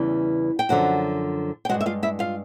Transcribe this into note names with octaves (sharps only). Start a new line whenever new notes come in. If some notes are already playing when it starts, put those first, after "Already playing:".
Already playing: E2 C#3 E3 G3
G5
F#2 D3 F3 F#4 F#5
G5
G2 D#3 G#3 F#4 F#5
E5
F4 F5
E4 E5
F4 F5